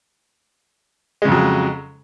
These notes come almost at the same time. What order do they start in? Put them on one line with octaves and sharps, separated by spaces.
G#3 C#3 F2 F#3